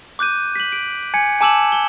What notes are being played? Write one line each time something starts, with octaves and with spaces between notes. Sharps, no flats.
D6 F#6 G6 D#7
B6 F#7
D7
G#5 G#6 C#7
G#5 A5 D6 E6 E7 F#7
G7